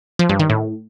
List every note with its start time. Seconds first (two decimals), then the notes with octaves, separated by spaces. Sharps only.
0.19 F3
0.29 G2
0.40 D#3
0.50 A2